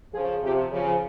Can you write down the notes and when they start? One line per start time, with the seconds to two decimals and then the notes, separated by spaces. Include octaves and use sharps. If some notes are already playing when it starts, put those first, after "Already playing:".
0.13 C#3 F3 G#4
0.41 C3 F3 G4
0.71 C#3 F3